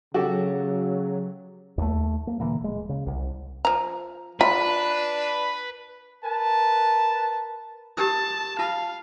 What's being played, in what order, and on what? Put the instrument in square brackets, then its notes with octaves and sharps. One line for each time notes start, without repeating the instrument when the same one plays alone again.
[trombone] C#3 [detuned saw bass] F#3 [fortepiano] F#4 G4 A4
[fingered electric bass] D#2 A3
A#3
A#2 D3 E3 A#3
D1 G#3
C#3
C2
[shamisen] F3 A#5
[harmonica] D4 [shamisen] F4 [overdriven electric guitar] B4 [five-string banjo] B5
[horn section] A#4 B4 A5
[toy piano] G4 A#4 D#6 [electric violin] A5
[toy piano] F4 A5 [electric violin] F5